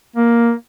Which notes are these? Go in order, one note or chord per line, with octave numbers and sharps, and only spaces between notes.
A#3